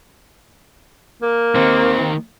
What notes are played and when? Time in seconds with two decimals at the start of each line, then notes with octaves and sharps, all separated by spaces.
1.22 A#3
1.55 D#2 D#3 C4